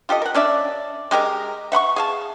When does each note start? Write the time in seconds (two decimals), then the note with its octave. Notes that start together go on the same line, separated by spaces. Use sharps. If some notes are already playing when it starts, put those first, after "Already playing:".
0.09 F4 G4 A4 D#5
0.22 A#4 F#5
0.34 C#4 D4 D5 E5
1.11 G#3 G4 A#4 D#5
1.72 E5 F#5 B5 C#6
1.96 G#4 F5 A5